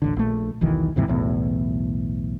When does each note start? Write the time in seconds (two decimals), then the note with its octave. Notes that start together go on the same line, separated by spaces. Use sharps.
0.02 D#1 A1 D3
0.17 A#1 A3
0.61 E1 B1 D#3 E3
0.96 D#2 G#2 C3 E3
1.08 B1 E2 A2